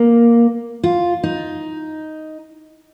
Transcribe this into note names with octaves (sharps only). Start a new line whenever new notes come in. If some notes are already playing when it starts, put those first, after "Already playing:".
Already playing: A#3
F4
D#4